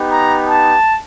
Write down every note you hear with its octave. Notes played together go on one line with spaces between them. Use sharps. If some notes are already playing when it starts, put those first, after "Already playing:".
Already playing: B3 D#4 G4
A#5
A5